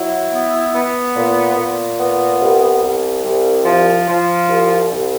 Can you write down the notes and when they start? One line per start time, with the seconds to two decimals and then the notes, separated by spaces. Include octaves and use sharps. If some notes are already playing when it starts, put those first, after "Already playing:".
Already playing: F#3 E4
0.31 B3
0.74 B3
1.15 A#2
1.56 A#2
1.98 B3
2.40 C2
2.82 C2
3.23 C2
3.65 F3
4.07 F3
4.48 C2
4.90 C2